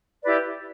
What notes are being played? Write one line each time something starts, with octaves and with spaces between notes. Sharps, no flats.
E4 G4 B4 D5